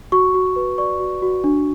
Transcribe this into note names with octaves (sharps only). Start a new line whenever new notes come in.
F#4 C#6
F#4
B4
D5 C#6
F#4
F#4
D4